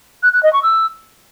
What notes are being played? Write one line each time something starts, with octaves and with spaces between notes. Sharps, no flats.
F#6
F#6
D#5
C#6
E6